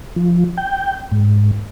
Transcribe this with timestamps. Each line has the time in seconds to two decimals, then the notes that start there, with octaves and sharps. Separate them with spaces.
0.16 F3
0.58 G5
1.12 G#2